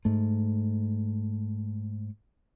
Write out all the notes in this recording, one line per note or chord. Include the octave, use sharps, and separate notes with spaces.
G#2 A3